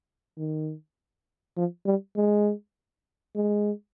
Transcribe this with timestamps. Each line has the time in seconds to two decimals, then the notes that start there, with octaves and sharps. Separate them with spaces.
0.38 D#3
1.57 F3
1.86 G3
2.16 G#3
3.36 G#3